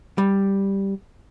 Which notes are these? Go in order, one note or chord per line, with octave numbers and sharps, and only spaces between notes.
G3